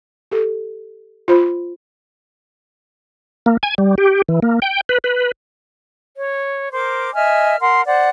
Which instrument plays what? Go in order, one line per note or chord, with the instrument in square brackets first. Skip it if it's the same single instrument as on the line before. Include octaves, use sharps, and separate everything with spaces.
[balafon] G4 A4
F4 C5 B5
[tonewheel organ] A#3
G#5
G3
G4
E3
A#3
G5
B4
B4
[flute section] C#5
A#4 C5 D6
D#5 E5 G#5 F6
A#4 F#5 C6
C5 D5 F#5